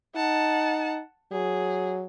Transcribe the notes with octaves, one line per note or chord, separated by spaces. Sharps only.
D#4 F#5 A5
F#3 G#4